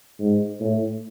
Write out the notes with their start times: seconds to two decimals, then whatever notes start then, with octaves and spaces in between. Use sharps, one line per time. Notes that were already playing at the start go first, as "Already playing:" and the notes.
0.20 G#2
0.61 A2